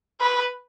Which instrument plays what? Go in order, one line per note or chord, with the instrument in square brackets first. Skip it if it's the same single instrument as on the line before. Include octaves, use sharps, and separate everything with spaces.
[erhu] B4